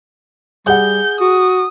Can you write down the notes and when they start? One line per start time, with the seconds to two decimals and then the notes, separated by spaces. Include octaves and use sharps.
0.67 G3 G#4 F#5 G6
1.21 F#4 D#6